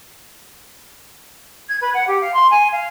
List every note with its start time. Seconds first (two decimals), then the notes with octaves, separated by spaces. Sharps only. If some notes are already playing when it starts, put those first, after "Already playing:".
1.69 G#6
1.81 B4
1.94 F#5
2.07 G4
2.21 F5
2.34 C6
2.51 G#5
2.72 F5